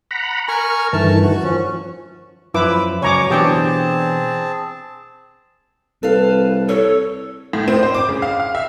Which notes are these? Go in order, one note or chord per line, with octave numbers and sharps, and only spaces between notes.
F#5 A#5 B5
A#4 G#5 A#5 C#6
G2 D#3 E3 A3 A5
F#4 C#6
F3 C#4
F#2 F3 E4 B4 D6 E6
C#2 F#2 F#3 C#5 G#5 A#5 C#6 D6
B2 E3 C4 D4 G4 G#4 G5 A5
C2 A4 B4 F5
A4 C#5
A2
C4
C5
D6
C#3
F5
F5
E5